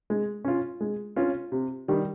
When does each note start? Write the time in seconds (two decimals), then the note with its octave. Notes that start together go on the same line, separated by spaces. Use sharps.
0.10 G#3
0.45 C#4 F4
0.81 G#3
1.16 C#4 F4
1.52 C3
1.88 D#3 G3